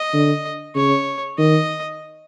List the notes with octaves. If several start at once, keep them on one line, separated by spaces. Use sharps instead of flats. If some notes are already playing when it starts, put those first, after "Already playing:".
Already playing: D#5
D3
C#3 C#5
D#3 D#5